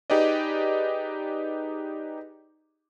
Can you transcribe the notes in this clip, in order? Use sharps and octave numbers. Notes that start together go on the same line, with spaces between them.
D#4 G4 G#4 B4 D5 D#5